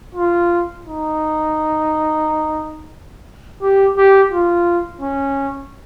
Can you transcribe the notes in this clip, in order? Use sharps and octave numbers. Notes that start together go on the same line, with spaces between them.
F4
D#4
G4
G4
F4
C#4